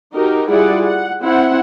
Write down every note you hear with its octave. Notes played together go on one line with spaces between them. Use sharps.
D#4 F#4 G4 A#4
G3 E4 F4 G#4 D5 F#5
F#5
C4 E4 C5 F#5